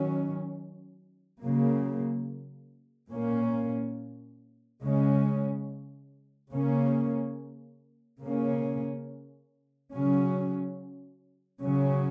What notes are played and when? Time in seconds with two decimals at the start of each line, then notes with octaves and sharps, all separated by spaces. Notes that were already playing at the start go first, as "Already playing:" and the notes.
Already playing: D#3 F#3 C#4
1.41 C#3 F#3 A#3
3.11 A#2 A#3 C#4
4.81 C#3 G#3 C#4
6.51 C#3 A#3 C#4
8.21 C#3 A#3 C#4
9.92 C#3 F#3 C#4
11.62 C#3 F#3 C#4